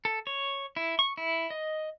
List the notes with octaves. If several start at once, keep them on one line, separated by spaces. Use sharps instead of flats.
A4
C#5
E4
C#6
E4
D#5